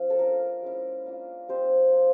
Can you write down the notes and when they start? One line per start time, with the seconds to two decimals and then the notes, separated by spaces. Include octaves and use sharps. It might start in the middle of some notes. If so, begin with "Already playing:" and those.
Already playing: F3 C#4
0.10 A4
0.19 A#3 D4 F4 A#4
0.63 G#3 C#4 E4
1.06 A#3 D4 F4
1.48 G3 C4 D#4 C5
1.92 F3 A#3 D#4